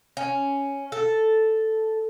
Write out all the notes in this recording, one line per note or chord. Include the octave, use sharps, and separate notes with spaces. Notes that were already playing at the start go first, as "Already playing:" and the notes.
C#4
A4